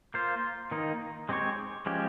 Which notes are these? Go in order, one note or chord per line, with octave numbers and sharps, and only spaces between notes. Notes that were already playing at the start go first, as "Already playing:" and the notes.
A#3 F4 C5
D#3 A#3 D#4
G#3 C4 G4 C#5
F3 G#3 C#4 G4